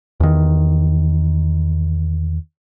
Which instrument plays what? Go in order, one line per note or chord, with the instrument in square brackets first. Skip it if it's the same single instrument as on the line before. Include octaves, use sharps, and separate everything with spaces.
[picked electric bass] E2 D#3